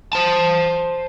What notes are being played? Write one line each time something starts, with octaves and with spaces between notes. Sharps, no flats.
C5 A5